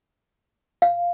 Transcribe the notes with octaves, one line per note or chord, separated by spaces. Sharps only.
F5